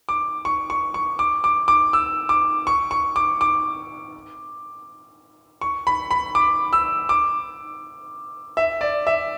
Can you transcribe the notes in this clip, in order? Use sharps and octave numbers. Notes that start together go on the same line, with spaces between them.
D6
C#6
C#6
C#6
D6
D6
D6
E6
D6
C#6
C#6
D6
D6
C#6
B5
B5
D6
E6
D6
E5
D5
E5